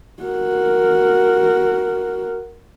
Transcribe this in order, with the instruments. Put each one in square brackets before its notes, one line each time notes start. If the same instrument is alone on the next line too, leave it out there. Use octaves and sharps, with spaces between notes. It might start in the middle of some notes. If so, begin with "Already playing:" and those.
[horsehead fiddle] F#4 A#4